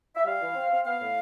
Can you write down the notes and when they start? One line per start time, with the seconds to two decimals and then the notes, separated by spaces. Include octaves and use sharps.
0.15 E5
0.25 G3 F5
0.40 E3
0.55 C4
0.71 C4
0.85 B3 F5
1.01 A2